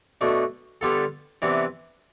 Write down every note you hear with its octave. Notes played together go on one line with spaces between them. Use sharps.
B2 A3 D4
D3 G3 B3 F4 A4
C3 E3 B3 D4